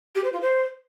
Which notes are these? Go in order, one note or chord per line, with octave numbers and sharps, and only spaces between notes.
G4
C5
F4
C5